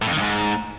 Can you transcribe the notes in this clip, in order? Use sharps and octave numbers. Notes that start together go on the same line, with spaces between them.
A2
F2
D#3
G2
G#2